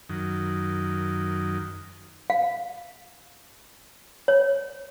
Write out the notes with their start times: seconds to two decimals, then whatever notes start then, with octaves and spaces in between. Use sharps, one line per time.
0.09 F#2 D#3
2.30 F5
4.28 C#5